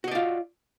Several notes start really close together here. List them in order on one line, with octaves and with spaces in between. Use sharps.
F#4 D#5 D5 F4